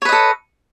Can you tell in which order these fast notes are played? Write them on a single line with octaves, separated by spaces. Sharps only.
C#5 B4 D#5 A4